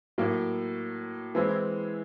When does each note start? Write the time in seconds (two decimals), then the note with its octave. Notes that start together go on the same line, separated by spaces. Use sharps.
0.18 A2 F#3 A#3
1.35 E3 G#3 C4 E4